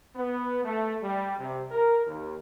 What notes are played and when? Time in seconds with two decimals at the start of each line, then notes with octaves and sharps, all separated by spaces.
0.16 B3
0.64 A3
1.03 G3
1.39 C3
1.71 A#4
2.07 D#2